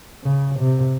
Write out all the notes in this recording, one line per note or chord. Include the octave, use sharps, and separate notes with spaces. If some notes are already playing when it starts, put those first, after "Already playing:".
C#3
C3